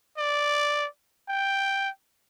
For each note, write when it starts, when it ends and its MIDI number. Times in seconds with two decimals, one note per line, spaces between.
0.18 0.87 74
1.29 1.89 79